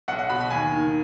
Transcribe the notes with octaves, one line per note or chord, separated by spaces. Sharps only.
B1 F#5
F#5
B2 B5
B5
D#2 G#5
D#3